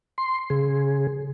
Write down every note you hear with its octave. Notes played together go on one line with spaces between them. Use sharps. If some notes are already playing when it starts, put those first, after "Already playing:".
C6
C#3 G#4